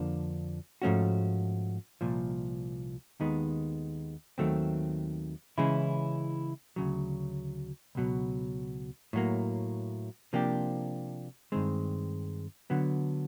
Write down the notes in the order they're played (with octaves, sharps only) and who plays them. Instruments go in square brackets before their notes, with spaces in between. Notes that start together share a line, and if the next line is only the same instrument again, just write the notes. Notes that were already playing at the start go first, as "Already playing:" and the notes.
Already playing: [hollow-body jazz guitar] F2 D3 F3 A#3 D4
G#2 F3 A3 C#4 F#4
C2 A#2 F3
D#2 D#3 G#3 B3 D#4
D#2 D#3 F#3 A3 C4
C#3 E3 G#3 C#4 E4
D2 C#3 F#3
C#2 B2 F#3
A2 F#3 A#3
C3 F3 A#3 D4 G4
G2 D#3 G#3 C4
D3 F#3 B3